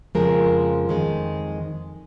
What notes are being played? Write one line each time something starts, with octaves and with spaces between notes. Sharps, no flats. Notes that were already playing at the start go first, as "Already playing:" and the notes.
F2 C#3 F3 G#3 A#4
F2 D#3 G#3